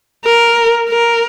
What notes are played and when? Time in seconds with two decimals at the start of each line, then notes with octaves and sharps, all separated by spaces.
0.25 A#4
0.89 A#4